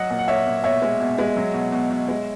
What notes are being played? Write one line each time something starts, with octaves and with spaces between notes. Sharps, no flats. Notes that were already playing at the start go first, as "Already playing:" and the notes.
Already playing: F#3 D#5 F#5
A#2
F#5
A#2 C#5 E5
A#2
B2 C#5 E5
G#3
B2
G#3
F#3
B2
B2
B2
G#3